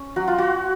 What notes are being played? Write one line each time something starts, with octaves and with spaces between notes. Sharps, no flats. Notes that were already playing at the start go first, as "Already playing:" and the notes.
Already playing: C#4
F#3 F#4
F4
F#4